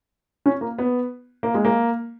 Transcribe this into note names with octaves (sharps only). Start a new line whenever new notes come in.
C#4
A#3
B3
A#3
G#3
A#3